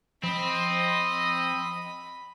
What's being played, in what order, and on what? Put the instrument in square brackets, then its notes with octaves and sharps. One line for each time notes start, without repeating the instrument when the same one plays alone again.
[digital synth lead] F3 [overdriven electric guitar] C4 [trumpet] D#5 [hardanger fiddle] B5